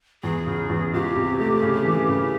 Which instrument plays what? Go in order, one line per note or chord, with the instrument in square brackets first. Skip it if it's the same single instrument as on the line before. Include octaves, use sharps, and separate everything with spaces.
[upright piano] E2 [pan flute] G#4
[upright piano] C#3
E2
[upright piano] C#2 [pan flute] G4
[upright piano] C3
A3
C#3
E3
C#3